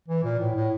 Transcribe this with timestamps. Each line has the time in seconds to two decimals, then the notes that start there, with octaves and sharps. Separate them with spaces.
0.08 E3
0.24 A#2
0.40 A2
0.55 A2